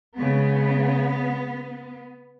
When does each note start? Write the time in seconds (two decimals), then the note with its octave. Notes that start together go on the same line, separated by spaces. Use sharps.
0.18 C#3 G#3 B3